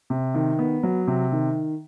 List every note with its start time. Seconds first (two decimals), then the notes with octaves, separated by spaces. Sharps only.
0.10 C3
0.34 D#3
0.59 B3
0.83 F#3
1.07 C3
1.32 D#3